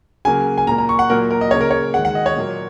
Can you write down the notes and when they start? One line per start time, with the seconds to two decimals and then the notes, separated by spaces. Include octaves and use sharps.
0.25 C#3 F#3 A#3 G#5
0.58 G#5
0.67 A#2 A#5
0.71 A#3
0.78 A#5
0.89 C#6
0.99 F#5
1.10 A#2 F#3 A#3 A#4
1.31 A#4
1.41 D#5
1.51 C#3 A#3 C#5
1.61 A#4
1.71 C#5
1.94 D#3 G#3 F#5
2.05 F#5
2.15 D#5
2.26 C#5
2.36 A#2 F#3 A#3